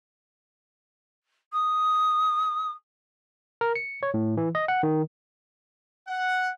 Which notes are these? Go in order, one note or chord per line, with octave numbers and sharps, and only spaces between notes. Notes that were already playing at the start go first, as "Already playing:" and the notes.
D#6
A#4
C#7
C#5
A2
E3
D#5
F#5
D#3
F#5